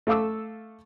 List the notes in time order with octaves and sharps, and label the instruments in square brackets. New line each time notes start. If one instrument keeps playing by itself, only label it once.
[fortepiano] A3 A4 F5 D6 E6